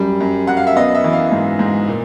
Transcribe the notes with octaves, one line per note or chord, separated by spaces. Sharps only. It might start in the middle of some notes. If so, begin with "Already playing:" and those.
Already playing: F#2 G3
F#2
F#2 F#5
F5
E5
B3 D#5
E5
E3
F5
G#2
G#2
A#2